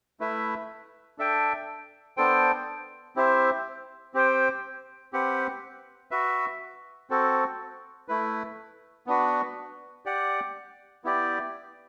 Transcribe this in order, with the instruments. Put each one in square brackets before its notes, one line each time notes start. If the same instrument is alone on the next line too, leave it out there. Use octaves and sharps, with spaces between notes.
[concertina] A3 E4 B4 E5
D4 A4 E5 G5
B3 D4 A4 C5 G5
C4 E4 G4 C5 E5
C4 G4 C5 G5
C4 G4 B4 F#5
F#4 B4 E5
C4 F#4 A4
A3 E4 B4
B3 D4 F#4 B4
G4 D5 F#5
B3 E4 G4 D5